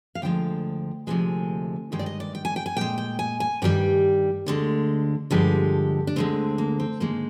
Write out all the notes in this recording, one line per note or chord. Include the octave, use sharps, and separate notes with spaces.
F5
D2 D3 F3 G#3 G5
D2 C3 F3 G#3 G#5
G2 D#3 G#3 G5
D5
D#5
D5
G5
G#5
G5
G#5
A#2 G#3 G5
G5
G#5
G#5
G2 D#3 G3 G5
D2 D3 G#3
G2 D3 F3 G#3 G4
D4
D2 D3 G#3 C4
A#3
C4
G#2 D#3 G#3 A#3